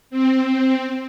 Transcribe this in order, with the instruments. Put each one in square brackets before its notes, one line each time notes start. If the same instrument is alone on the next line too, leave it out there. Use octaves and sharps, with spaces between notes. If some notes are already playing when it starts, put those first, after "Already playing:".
[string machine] C4